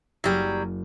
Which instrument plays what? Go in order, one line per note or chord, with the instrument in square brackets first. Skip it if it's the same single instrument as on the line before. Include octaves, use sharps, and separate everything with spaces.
[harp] F#1 D#7 [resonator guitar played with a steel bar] F#3 G3